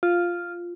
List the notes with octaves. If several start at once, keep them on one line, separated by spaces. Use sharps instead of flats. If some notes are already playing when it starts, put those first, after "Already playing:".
F4